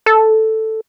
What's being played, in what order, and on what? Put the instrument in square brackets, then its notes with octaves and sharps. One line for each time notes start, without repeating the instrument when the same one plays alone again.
[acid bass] A4